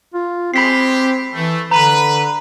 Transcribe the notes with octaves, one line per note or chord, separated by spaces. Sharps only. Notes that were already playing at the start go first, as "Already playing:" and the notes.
F4
G#3 C4 G4 B5 B6 C7
E3 A3
D3 B4 A#5 B5